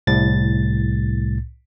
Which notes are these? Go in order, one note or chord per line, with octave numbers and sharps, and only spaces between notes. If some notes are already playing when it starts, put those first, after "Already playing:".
C2 A2 A6